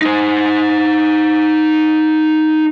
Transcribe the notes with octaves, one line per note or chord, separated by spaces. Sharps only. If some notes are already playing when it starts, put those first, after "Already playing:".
D#4 C5